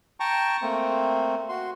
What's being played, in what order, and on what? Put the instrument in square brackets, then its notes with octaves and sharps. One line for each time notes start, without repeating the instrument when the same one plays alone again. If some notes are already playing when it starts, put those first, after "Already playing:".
[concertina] G5 A5 A#5 C#6
A3 A#3 C4
F#4 C6